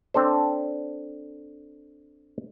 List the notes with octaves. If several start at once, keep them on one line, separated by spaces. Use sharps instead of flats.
C4 D4 A4 C5